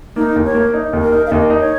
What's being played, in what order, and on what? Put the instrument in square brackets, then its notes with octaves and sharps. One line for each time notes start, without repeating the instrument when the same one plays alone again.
[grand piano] A#3 [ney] D#4
[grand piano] D#2
[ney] C#5
[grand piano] A#3
D#4
D#2
[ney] A#4
[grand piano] D#4
[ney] F5
[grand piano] D#2 [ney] D#5
[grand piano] D#4
[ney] C#5